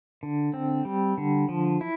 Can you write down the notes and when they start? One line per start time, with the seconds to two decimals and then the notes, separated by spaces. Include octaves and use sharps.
0.23 D3
0.54 C4
0.85 G3
1.18 D3
1.49 F3
1.81 E4